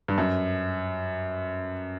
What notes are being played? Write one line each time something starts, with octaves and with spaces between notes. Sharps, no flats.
G2
F#2